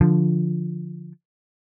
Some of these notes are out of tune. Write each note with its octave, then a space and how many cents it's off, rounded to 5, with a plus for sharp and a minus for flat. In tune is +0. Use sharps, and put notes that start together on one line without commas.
D3 +0 F3 +0